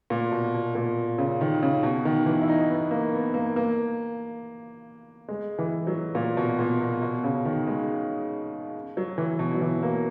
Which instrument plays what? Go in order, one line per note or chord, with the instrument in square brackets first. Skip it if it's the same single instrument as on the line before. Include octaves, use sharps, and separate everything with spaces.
[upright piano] A#2
B2
B2
A#2
C#3
D#3
C#3
B2
D#3
E3
E4
D#4
B3
A#3
B3
A#3
A#3
G#3
E3
F#3
A#2
B2
A#2
B2
B2
C#3
D#3
G#3
F#3
E3
B2
F#3
E3
A#3